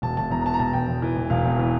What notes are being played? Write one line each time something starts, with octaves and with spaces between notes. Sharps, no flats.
E1 A5
E1 A5
E2 A#5
A#5
E3 A5
A#5
E1 A5
E1 G5
E2
E3
E1
E1 F5
E2
E3